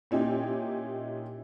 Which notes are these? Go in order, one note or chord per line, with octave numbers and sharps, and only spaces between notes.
A#2 C#4 D#4 E4 G4